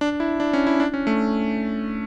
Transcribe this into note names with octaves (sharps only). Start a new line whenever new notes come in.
D4
E4
D4
C#4
E4
D4
C#4
A3